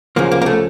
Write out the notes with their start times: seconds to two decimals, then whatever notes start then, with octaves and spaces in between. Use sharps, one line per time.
0.16 C#2 C#3 F3 A#3
0.32 A#3
0.42 A#3
0.46 A3